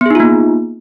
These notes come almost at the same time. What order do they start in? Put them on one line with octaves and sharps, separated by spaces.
B3 G#4 D#4 F4 A#3